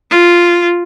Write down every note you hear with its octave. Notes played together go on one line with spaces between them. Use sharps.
F4